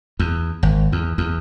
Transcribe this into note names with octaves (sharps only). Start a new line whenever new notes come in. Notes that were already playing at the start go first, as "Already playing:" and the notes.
E2
G#1
E2
E2